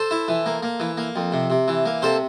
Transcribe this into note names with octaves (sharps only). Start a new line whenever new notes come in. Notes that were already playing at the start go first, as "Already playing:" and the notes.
Already playing: A4 C5
E4
E3
A#3
A#3
E3
A#3
F2
C3
C3
E3
A#3
C3 A4 C5